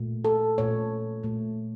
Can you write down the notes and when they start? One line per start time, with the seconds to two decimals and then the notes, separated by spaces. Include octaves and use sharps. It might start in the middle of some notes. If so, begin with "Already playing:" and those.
Already playing: A#2 A3
0.25 A4
0.58 A#2 A3 C#5
1.23 A#2 A3